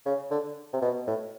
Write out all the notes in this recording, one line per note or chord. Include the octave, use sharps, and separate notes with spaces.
C#3
D3
C3
B2
A2